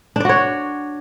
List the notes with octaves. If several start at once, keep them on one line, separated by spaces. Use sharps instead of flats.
D4 F#4 C#5 D5